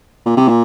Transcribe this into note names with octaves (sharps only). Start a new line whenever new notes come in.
A#2
C3
A#2